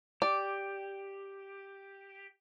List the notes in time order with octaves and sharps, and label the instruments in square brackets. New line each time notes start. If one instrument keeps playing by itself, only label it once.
[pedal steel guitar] G4 [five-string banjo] D5